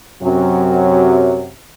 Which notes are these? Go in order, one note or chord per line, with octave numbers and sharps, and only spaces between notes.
F#2 C3 F#3